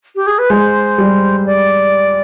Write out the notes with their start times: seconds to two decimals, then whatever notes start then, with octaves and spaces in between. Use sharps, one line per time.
0.16 G4
0.27 G#4
0.39 B4
0.50 G#3 C5
0.98 G3
1.46 D5